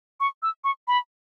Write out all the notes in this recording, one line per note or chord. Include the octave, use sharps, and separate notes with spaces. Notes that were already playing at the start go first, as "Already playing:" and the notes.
C#6
E6
C#6
B5